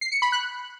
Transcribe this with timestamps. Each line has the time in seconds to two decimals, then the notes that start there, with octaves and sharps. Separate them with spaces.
0.01 C7
0.12 C#7
0.22 B5
0.32 F#6